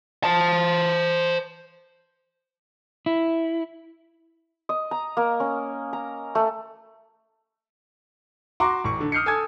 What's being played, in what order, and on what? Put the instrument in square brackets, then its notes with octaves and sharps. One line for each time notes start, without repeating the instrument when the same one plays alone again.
[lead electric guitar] C5 A5
[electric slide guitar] E4
[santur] D#5
A#5
A#3
C#4
A#5
A3
[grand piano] F#4 A#5 C6 D6
A1 C#6
D3
D#6 F6 G6 C7 C#7
A4 G#5 D#6 G#6